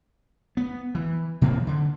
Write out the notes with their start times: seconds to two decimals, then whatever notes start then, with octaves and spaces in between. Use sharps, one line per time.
0.57 B3
0.95 E3
1.41 B2 E3 A#3 C4
1.67 D3